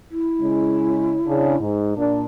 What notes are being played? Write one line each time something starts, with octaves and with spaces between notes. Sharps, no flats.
E4
C#3 G#3 C#4
C#3 D4
G#2
A#2 D4